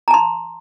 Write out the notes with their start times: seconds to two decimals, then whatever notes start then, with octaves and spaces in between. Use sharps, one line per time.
0.08 A#5
0.11 A5
0.14 C6